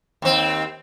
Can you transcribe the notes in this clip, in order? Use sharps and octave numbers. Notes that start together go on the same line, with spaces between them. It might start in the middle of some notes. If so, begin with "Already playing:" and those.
D#2 C4